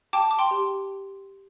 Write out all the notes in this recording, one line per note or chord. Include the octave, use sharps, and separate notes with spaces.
G5 A5 D6
D6
G5 C6
G4